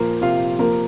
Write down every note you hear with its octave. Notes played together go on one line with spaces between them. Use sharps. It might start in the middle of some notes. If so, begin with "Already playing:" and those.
Already playing: A#2 F3 A#3 A#4
C3 F4 F5
F3 A#3 A#4